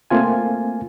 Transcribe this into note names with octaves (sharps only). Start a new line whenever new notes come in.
A3 A#3 C4 F4 G#5